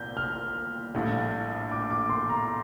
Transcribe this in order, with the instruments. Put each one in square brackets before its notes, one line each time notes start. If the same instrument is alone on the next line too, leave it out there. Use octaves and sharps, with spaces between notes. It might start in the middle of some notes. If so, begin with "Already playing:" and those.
Already playing: [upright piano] C2 A#2 C4 [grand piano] G6
[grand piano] F6
[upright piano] A#1 A2 G3
[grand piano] D6
D6
C6
A#5